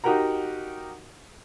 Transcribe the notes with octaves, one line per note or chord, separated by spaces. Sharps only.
D#4 F#4 G4 A#4 F#5 A#5